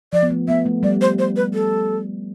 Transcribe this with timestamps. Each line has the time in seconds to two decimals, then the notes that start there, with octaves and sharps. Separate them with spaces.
0.13 F3 D5
0.23 B3
0.30 A3
0.48 B3 E5
0.66 A3
0.83 G3 D5
1.01 C5
1.19 C5
1.36 B4
1.54 A4